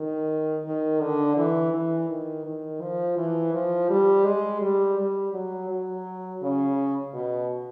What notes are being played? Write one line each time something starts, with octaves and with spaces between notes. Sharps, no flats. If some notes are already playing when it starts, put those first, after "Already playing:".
Already playing: D#3
D#3
D3
E3
E3
D#3
D#3
F3
E3
F3
G3
G#3
G3
G3
F#3
F#3
C#3
B2